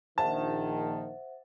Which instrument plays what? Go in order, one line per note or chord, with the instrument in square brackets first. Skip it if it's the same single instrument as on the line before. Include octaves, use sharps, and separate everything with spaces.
[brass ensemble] A#1 D#3 [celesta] C5 E5 F#5 [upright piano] A5